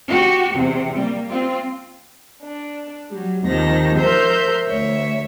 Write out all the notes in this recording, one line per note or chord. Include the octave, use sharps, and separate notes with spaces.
F#4 G4
E2 C3
G3 A#3
C4 F4
D4
F#3 G3
D#2 C3 D#3 F3 A#6
F3 A#4 C5 E5 G6
D2 C#5 E5